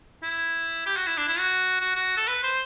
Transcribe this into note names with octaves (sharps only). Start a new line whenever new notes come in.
E4
G4
F#4
E4
D4
E4
F#4
F#4
F#4
A4
B4
C5